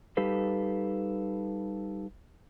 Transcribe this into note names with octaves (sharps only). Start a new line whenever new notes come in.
G3 D#4 G4 A4 B4 F5